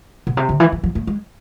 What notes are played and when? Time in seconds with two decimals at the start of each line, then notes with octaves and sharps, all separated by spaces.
0.27 B2
0.37 C3
0.49 D3
0.60 E3
0.72 E3
0.83 F3
0.95 A3
1.07 G#3